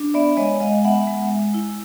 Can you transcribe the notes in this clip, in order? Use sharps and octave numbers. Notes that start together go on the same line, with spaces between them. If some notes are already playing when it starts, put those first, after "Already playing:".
Already playing: D4
B3 D5 E5
G#3 C#5 D#5
G#3 D#5 F5
B3 E5 F#5
G#3
G#3
E4